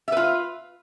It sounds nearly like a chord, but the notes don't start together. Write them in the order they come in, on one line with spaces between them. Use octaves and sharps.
E5 B4 F4